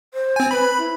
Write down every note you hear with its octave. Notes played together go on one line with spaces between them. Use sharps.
C5
C4 G#5
B4 B5
E4